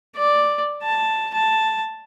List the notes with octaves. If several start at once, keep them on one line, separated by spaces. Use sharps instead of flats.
D5
A5
A5